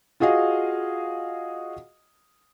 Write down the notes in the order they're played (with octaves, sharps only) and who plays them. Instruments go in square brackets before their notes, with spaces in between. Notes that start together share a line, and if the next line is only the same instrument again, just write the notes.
[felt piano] F4 F#4 G#4 D#5 F5